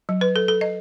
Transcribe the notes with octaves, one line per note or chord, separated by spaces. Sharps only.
F#3
B4
A4
A4
D#5